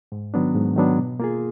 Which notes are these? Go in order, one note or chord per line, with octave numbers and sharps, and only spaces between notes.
G#2
D#3 F#3 B3 D4
G#2
D#3 F#3 B3 D4
B2
A#3 F4 G#4